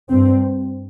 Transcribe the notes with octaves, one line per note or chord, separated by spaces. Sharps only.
G2 C4